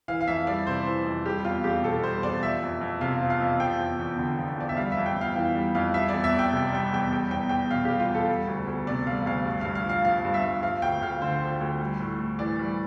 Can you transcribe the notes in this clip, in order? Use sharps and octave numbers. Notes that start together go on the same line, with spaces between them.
E3 F5
F5
F2 E5
G3 D5
C3 C5
E3
F2
G3 G4
E2 F4
E2 G4
B2 A4
G3 C5
E2 D5
F3 E5
F2
F2
C3 F5
F3
F5
F2
F3 G5
E2
E2
D3
F3
E2 D5
E5
G3 F5
E5
F2
G5
F2
F5
E3 G5
G3
F2 F5
G3 E5
E2 D5
E5
E2
G5
C3 G5
G3 G5
E2 G5
G3 G5
E2 G5
E2 G5
B2 F5
G3 G4
F4
E2
A4
G3
D2
D2
C3 D5
G3 F5
D2 F5
G2
G2 F5
F5
F3 F5
F3 F5
G2
E5
G2
F3 F5
D2 G5
D2 F5
D3 C5
F3
D2
G3
A2
A2
E3 D5
G3